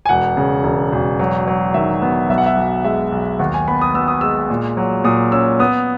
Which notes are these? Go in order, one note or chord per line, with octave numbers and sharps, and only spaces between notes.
G#5
E1 F#5
C#3
E1
E1
F#3
F#3
D#3 E5
B3
B1 E5
F#5
E5
B1
G#3 E5
B1
D#2 F#5
G#5
B3 B5
D#6
B3 E6
D#6
G#3 E6
A#2
F#3
A#2 D#6
C#4 E6
B3 D#6